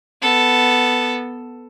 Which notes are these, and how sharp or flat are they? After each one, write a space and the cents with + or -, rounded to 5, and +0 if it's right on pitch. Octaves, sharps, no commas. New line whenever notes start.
B3 +0 A4 +0